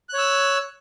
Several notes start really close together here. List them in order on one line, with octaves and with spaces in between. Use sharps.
F#6 C#5 E6